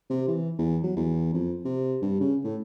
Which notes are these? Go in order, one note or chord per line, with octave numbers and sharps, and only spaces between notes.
C3
E3
E2
F#3
E2
F2
C3
G2
C#3
A2